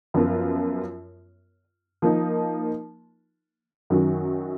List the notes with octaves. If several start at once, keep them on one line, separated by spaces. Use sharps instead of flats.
F#2 F3 B3 F4 A#4
F3 A#3 D#4
F#2 D#3 F#3 C#4 F#4